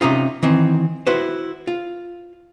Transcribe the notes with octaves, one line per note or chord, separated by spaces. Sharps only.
C3 C#4 D#4 F4
D#3 E3 C4
E4 F#4 B4 C5
F4